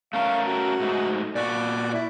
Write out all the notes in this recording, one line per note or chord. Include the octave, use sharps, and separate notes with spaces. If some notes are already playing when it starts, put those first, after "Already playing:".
A3 C#4 A#4 F5
F#4
G#2 A3 D#4
A#2 F#4 D5
E4